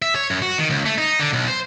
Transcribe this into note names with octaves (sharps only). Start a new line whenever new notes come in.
E5
C#5
F#2
F#4
D#3
C#2
A3
D#4
D3
B1
C5